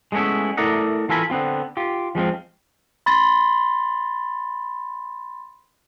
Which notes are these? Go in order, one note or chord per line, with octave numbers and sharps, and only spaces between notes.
G#3 A3 B3 C#4 E4
A3 E4 A#4 D5 D#5 F#5
E3 F4 A4 A#4 G#5 B5
D3 B3 C4 F4
F4 G4
F3 G#3 C4 F4
B5 C6 A6